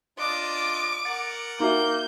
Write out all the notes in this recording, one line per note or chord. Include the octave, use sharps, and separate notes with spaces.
D4 F4 D#5 D6
A#4 F#5 A6
A#3 D#4 F#4 E5 G6